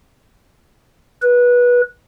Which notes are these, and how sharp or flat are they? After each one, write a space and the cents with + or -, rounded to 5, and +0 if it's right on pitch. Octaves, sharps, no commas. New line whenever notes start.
B4 -20